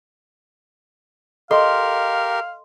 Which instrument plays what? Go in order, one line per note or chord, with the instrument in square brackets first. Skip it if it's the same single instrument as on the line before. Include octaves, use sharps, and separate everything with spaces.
[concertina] G4 A#4 [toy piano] A4 D#5 [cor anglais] F5 [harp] C6